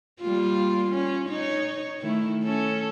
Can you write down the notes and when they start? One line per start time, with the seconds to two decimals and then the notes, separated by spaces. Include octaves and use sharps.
0.20 G3 A#3 F4
0.89 C#4
1.29 D#4 C#5
1.99 D#3 A3 E4
2.44 C#4 A4